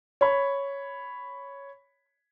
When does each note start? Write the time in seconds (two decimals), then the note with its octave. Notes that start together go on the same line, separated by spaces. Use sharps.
0.21 C#5 B5